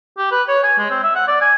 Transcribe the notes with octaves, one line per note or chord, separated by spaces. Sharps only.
G4
B4
C#5
G#5
G#3
C4
E5
F#5
D5
G#5